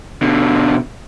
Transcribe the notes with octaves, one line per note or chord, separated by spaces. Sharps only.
B2 D3